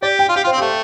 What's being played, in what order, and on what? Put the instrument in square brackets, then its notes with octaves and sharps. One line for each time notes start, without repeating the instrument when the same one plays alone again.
[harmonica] G4 [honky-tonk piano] D5
[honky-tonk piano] G5
[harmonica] F4
[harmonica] G4 [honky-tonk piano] F5
[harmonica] F4 [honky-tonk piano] C5
[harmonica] C4
[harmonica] A3 [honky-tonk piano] G4